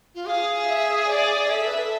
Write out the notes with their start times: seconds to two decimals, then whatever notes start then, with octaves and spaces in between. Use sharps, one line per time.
0.14 F4
0.26 G#4 F5
0.68 E5
1.10 D5
1.50 A4 E5
1.64 B4
1.78 A4